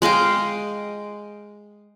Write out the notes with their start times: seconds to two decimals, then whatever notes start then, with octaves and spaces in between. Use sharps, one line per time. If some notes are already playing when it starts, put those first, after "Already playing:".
0.02 G#3 D#5 F5 G5